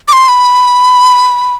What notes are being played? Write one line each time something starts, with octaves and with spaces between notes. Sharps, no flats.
D6
C6
B5